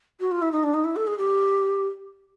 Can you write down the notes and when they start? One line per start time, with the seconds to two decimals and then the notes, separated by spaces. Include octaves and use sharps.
0.20 F#4
0.31 F4
0.42 E4
0.52 D#4
0.63 D4
0.74 D#4
0.84 E4
0.96 A4
1.07 G#4
1.18 G4